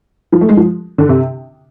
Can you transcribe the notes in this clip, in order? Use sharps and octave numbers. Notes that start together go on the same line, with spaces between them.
F3
A3
G#3
F3
D3
C3